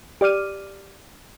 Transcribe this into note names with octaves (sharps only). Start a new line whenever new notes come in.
G4 D5 D6 F6 D#7